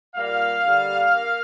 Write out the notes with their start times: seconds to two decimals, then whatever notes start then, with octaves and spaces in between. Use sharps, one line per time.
0.16 A#2 G3 A#3 F5
0.64 D3 G3 A#3
1.13 A#3